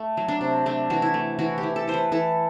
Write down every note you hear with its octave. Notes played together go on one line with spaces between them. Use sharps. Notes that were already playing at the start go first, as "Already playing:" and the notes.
Already playing: A3
F#3
D4
C3
A3 D4
E3 F#4
E4
A3
E3 F#4
G4
E3
A4
E3 C5
B4
E3 A4